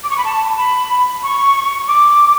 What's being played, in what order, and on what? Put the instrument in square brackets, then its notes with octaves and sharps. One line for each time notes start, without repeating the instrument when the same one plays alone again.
[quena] D6
C#6
B5
A5
B5
C#6
D6